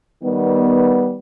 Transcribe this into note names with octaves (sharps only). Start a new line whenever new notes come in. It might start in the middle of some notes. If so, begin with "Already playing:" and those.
D#3 G3 B3